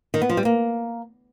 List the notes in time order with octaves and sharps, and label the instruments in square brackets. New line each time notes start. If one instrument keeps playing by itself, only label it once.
[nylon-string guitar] D#3
B3
F3
G3
A#3